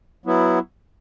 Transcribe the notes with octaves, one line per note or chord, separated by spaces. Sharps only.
F#3 B3 E4